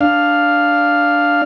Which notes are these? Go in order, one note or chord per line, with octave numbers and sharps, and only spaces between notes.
D4 F5